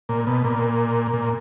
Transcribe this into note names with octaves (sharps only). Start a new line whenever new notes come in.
A#2
B2
A#2
A#2